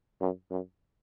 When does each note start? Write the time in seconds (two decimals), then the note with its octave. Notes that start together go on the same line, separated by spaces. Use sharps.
0.21 F#2
0.51 F#2